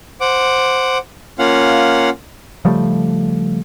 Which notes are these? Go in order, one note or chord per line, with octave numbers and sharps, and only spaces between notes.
C5 F#5 D6
A#3 C#4 F4 F5 F#5
C#3 F3 G3 A3